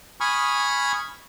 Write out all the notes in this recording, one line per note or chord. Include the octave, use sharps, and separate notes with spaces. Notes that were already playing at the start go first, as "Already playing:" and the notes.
G#5 B5 C#6 D#6 F6